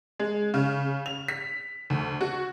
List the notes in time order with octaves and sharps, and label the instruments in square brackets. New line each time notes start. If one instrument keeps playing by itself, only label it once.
[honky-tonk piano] G#3
C#3
F7
B6
D2
F#4